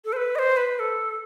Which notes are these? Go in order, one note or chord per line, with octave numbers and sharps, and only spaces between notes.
A4
C5
B4
D#5
C5
B4
A4